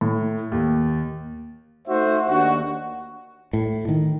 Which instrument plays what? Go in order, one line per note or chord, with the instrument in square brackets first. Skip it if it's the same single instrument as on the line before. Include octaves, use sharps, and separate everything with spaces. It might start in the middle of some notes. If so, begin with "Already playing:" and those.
[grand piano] A2
D#2
[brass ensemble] A3 D#4 F#4 C5 E5
D#2 D4 F#4
[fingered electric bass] A2
D#3